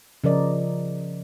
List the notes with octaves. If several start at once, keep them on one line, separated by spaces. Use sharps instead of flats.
C#3 F3 A#4 D5 D#5